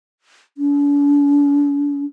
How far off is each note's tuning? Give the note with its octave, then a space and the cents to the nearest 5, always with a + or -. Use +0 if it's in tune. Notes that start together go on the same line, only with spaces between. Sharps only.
D4 -45